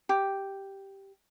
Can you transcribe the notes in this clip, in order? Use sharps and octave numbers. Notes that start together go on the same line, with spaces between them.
G4